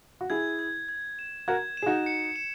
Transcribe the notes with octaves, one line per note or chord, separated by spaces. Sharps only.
F#4
E4 G#4 G#6
G#6
G#6
E7
F#4 A#4 G#6
E7
G#4
D#4 F#4
C#7
E7